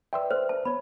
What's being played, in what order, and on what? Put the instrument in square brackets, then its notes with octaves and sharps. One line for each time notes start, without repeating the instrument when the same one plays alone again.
[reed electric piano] B4 D5 E5 [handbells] G5 C6 E6
[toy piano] C5 [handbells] F6
[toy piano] A5
[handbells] B3 C#5 [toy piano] B5